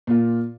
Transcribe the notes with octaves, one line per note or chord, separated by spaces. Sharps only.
A#2 A#3 F4